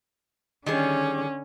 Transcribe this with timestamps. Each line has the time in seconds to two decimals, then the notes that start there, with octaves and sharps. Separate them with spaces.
0.66 D3 D#3 G3 C#4 G#4